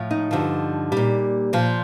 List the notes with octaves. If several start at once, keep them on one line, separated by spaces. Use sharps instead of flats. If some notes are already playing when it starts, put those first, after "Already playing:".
Already playing: A2 F3
D#4
G2 D3 F3
A#2 G3
A#2 F3